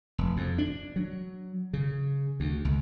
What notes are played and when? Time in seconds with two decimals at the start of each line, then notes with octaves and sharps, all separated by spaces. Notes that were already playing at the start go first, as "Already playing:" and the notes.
0.18 F1
0.37 F2
0.58 D4
0.96 F#3
1.73 C#3
2.40 D2
2.65 C#2